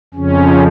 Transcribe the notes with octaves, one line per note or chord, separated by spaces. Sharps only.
F2 C#3 F3 C#4